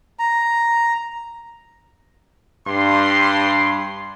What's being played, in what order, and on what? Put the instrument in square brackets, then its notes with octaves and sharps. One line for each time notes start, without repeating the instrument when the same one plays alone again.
[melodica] A#5
[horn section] G2 C6